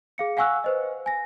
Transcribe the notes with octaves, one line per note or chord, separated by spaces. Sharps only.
G#4 F5 C#7
F5 F#5 G#5 C#6 E6 F#6
B4 C5 D#5
G#5 A#6